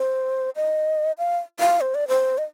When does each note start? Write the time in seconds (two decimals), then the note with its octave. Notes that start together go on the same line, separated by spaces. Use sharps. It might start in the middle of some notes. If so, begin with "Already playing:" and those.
Already playing: C5
0.56 D#5
1.18 F5
1.60 F5
1.81 C5
1.95 D5
2.08 C5
2.38 D#5